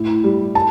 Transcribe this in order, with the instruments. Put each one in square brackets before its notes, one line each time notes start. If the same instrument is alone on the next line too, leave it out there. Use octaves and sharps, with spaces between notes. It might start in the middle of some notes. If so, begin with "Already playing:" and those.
Already playing: [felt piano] A2
G3
A5